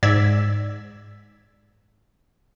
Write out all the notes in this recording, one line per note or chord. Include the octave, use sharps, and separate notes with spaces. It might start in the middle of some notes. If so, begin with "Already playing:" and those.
G#2 D5 E6 G#6 B6